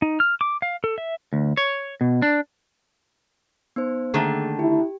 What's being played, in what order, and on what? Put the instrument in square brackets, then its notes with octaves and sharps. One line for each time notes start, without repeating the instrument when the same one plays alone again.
[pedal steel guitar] D#4
F6
D6
F5
A4
E5
[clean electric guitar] D2
C#5
B2
D4
[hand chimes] B3 D#4 C5
[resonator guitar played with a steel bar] D3 D#3 A3 [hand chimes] A#3 G#4 A5
[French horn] E4 [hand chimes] G4